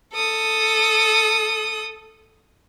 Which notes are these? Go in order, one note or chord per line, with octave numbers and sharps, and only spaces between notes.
A4 D#6